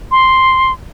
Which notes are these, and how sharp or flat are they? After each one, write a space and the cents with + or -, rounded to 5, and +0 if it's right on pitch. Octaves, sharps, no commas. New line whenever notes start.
C6 +0